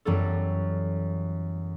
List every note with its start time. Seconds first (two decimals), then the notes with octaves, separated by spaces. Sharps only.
0.05 F#2 E3 G3 B3 E4 A4